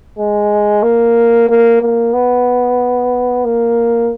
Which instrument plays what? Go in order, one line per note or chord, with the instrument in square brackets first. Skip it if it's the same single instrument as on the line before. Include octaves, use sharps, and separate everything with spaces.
[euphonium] G#3
A#3
A#3
A#3
B3
A#3